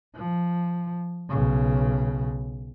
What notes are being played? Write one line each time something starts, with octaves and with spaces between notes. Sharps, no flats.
F3
B1 C#3